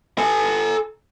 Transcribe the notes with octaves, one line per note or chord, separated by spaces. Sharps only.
A4 G#5